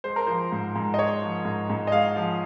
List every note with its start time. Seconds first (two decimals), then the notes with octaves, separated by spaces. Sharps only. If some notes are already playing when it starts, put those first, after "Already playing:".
0.04 G#3 C5
0.16 A#4
0.27 F3 C5
0.52 G#2
0.76 G#2
0.94 D#5
0.98 G#3 C#5
1.23 F3
1.45 G#2
1.70 G#2
1.87 D#5
1.92 G#3 F5
2.16 F3